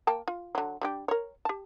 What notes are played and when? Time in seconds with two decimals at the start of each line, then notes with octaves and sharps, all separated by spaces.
0.07 A#3 G5 A5
0.28 F4
0.55 D3 F#3
0.81 G3 D4 G4
1.08 A#4 C#5
1.45 G4 A5